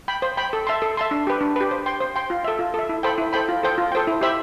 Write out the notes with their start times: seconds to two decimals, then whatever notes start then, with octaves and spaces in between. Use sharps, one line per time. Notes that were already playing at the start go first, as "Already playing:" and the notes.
0.08 G5 B5
0.22 C5
0.37 G5 B5
0.53 A4
0.67 E5 A5 C6
0.82 A4
0.97 E5 A5 C6
1.11 D4
1.27 G4 B4
1.41 D4
1.56 G4 B4
1.71 C5
1.86 G5 C6
2.00 C5
2.16 G5 C6
2.30 F4
2.44 A4 E5
2.59 F4
2.74 A4 E5
2.89 E4
3.03 A4 C5 G5 B5
3.18 E4
3.33 A4 C5 G5 B5
3.49 F4
3.63 A4 C5 G5
3.78 F4
3.92 A4 C5 G5
4.07 E4
4.21 G4 C5 E5 B5